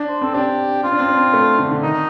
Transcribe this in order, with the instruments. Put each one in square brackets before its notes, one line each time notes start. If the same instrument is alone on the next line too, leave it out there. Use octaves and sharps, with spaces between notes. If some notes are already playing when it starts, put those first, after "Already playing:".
Already playing: [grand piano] D4
[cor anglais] C5
[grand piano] C4 [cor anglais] A4
[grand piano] D4 [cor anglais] G4
[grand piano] C4 [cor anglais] F4
[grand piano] D4
C4
D4
C4
A3
D3
D3
[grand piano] D#3 [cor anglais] D#4